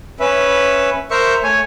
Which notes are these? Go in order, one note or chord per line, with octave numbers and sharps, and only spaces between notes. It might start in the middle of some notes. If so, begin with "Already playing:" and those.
C#4 B4 E5
A#4 C5 E5 C#6
A3 C#5 G#5